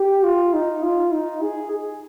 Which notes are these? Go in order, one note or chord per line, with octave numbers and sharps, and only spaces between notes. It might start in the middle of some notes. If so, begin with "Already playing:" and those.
Already playing: G4
F4
D#4
F4
D#4
G#4
G#4